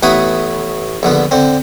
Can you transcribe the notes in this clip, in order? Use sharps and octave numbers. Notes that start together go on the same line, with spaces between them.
A1 A3 B3 E4 F#5 D#6
A#1 D3 B3
D3 C4